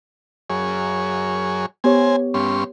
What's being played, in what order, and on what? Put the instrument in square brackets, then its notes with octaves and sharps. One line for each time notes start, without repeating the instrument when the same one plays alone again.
[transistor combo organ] F#2 G#4 C#5
[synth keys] B3 G4 C#5 [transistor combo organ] C5 G#5
[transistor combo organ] G2 C#4 C6